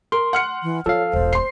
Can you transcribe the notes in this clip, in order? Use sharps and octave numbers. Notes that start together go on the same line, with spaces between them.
A#4 C6
F#5 F6 C#7
E3
F3 C#4 A4 C#5 F5
E1 A#1 C5
C6 C7